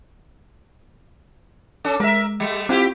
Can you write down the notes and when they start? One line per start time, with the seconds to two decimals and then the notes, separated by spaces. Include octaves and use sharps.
1.84 C#4 A4
2.00 G#3 A#4 E5
2.40 G3 A3
2.69 C4 E4 F4 G4